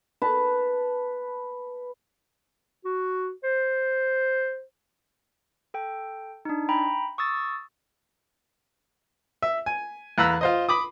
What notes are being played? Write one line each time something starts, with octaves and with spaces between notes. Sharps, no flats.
B4 A5
F#4
C5
A4 G5
D4 D#4
G5 A#5 B5
C#6 D#6 E6 A6
E5
G#5
E2 F5 A#5 B5 E6 F#6
F4 C5 D#5
B5 D6 D#6